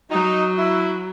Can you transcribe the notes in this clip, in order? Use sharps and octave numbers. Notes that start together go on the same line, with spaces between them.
F#3 D#4
E4